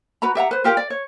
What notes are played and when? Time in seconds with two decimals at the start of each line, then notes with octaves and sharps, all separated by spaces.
0.22 F#4 B4 A#5 B5
0.35 G4 E5 F#5 A#5
0.51 B4 C5
0.64 F4 G4 A#4 G5
0.77 D5
0.90 C#5